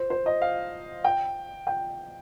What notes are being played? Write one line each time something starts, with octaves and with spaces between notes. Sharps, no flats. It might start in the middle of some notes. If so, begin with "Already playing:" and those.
Already playing: C5
C5
D#5
F5
G5
G5